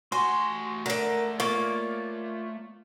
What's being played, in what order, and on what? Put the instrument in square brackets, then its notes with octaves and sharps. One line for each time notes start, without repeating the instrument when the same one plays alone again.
[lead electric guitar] A3 G#5 [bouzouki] F#4 [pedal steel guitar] C6
[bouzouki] D3 D5 [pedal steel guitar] A#4
[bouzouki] A#3 [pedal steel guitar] F4 C#5 D5